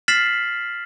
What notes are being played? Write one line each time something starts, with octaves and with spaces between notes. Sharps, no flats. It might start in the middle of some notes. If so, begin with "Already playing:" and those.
F6 A6 B6 C7 E7 F#7